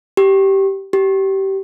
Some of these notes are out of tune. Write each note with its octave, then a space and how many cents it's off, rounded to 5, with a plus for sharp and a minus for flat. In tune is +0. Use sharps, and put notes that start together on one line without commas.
G4 -10
G4 -20